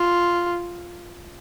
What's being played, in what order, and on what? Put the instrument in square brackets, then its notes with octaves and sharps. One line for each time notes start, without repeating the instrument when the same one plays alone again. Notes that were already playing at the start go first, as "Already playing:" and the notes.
Already playing: [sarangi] F4